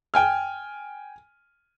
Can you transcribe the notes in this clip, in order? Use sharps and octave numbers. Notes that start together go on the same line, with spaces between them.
G5 G#5 F6